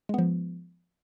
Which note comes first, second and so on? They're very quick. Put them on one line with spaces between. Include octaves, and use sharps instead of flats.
G#3 B3 F3